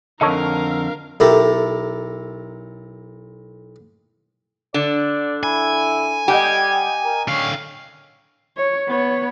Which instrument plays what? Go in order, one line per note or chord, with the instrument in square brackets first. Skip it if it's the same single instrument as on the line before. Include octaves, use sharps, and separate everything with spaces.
[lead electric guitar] F2 D3 [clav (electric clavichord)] D#4 A4 C#5 [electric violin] A#4 F5
[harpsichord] B1 E4 G4 A4 A#4
[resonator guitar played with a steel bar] D3 [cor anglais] D5
[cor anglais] E4 [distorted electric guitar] G#5
[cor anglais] G3 [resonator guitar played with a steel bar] G4 [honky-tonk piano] D#5 F#5 G5
[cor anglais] A#4
[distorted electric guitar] D3 F5 [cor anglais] C#4
[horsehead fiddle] C#5
B3 C#5